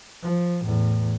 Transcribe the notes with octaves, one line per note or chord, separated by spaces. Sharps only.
F3
E2 A2